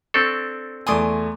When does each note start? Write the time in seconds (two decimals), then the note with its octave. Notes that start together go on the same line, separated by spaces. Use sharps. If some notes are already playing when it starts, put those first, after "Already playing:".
0.14 C4 D4 A4 C#6
0.87 E2 A3 D5 G#5 C6 D#6